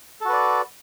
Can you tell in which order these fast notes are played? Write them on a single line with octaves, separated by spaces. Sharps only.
A4 F#4 B4 D5